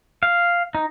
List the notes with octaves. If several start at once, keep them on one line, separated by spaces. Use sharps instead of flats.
F5
D#4